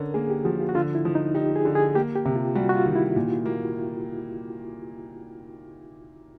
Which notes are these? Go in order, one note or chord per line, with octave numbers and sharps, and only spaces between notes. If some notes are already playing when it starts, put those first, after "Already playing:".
Already playing: D3 C#4 A#4
A#3 G#4
G4
F3 F#4
F4
F#4
D3 F4
E4
F3
D#4
D#4 G4
G#4
D3
G#4
A#3 G4
G4
C3
F4
G3 F#4
F#4
F4
D#3
E4
A#2
A#3